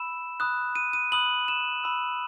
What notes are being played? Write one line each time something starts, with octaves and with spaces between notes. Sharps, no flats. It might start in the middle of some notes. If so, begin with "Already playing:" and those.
Already playing: B5 E6 E7
B5 D#6 F#6
D#7
D#7
B5 D#6 F#6 F#7
E7
B5 E6